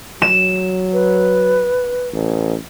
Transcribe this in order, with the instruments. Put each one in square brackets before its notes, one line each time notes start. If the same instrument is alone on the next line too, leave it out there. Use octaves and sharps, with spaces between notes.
[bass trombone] F#3 [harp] E7
[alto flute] B4
[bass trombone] A1